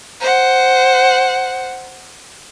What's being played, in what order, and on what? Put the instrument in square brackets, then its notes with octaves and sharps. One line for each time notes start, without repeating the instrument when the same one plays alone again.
[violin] C5 F#5